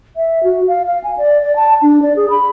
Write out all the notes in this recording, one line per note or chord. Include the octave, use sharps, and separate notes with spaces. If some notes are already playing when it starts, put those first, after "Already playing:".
E5
F#4
F5
F5
G#5
D5
D5
A5
D4
D5
G#4
B5